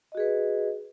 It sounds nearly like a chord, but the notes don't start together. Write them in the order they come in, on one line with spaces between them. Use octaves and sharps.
D#5 F#4 G#4 B4